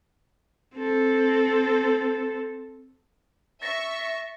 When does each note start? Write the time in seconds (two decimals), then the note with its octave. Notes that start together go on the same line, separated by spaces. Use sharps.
0.76 C4 A4
3.62 E5 C#6 A6 A#6